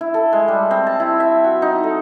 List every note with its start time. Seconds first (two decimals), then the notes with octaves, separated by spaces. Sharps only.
0.01 E4
0.14 A4
0.33 G#3
0.48 G3
0.71 C4
0.87 A5
1.00 E4
1.20 E5
1.44 F#4
1.62 D#4
1.84 A4